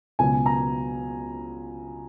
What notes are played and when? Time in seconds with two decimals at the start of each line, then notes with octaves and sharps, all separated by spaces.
0.19 C#2 B2 F#3 G#5
0.46 A#5